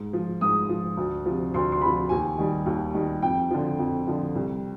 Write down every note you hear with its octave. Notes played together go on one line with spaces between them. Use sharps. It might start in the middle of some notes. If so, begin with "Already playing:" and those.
Already playing: G#2
F3
G#2 D#6
F3
D2
C3 F3
D2 C6
C6
C3 F3 B5
D#2 G#5
D#3 G3
D#2
D#3 G3
F2 G5
D3 F3
F2
D3 F3
C2